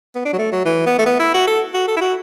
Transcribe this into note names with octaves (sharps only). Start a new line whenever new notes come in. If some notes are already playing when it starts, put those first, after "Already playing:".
B3
D4
F#3
A3
F#3
E3
B3
A3
B3
E4
F#4
A4
F#4
A4
E4
F#4